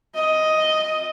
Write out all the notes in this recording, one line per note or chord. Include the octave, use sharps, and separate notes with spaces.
D#5